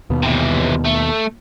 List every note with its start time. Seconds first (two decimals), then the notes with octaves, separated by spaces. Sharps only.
0.10 D#2 B2
0.23 C3 E3
0.84 A3